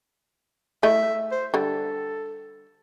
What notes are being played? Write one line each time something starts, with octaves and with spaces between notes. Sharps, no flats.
A3 E4 D#5 E5
C5
D3 G3 A4